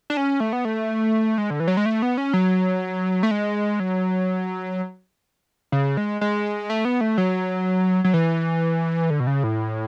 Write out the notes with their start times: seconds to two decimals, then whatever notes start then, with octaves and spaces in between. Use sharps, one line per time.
0.10 D4
0.17 C#4
0.40 A3
0.53 B3
0.65 A3
1.38 G#3
1.50 D3
1.60 E3
1.68 F#3
1.77 G#3
1.86 A3
2.02 B3
2.18 C#4
2.34 F#3
3.23 A3
3.31 G#3
3.80 F#3
5.72 C#3
5.97 G#3
6.21 G#3
6.70 A3
6.85 B3
7.01 A3
7.18 F#3
8.04 F#3
8.14 E3
9.10 D3
9.20 B2
9.27 C#3
9.44 A2